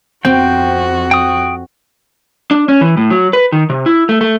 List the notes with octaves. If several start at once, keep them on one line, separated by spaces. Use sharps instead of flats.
F2 C4 F#4 G5
G5 D#6
D4
C#4
E3
A2
F#3
B4
D#3
C3
E4
A3
A3